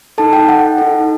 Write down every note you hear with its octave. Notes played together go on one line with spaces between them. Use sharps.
D#4 A4 A5
G5
F#5
D#4 A4